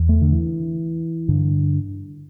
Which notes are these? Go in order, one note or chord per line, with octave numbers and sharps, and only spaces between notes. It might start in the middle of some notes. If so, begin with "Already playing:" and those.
Already playing: E2
A3
D3
E3
G2 D3